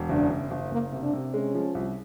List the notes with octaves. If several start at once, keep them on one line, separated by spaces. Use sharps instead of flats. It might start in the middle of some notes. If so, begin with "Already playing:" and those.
Already playing: E1
F#1 D4
F#1
F#1
F#1 A#3
C3
D4
C3
G#3 C#4
F3
C2